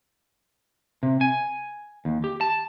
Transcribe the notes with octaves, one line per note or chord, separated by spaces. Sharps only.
C3
G#5
D#2
G4
A5